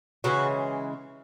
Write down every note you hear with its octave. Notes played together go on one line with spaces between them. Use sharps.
C#3 E3 G#3 F#4